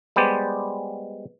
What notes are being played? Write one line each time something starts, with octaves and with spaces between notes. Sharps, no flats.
G3 G#3 B3 G4 C5 D5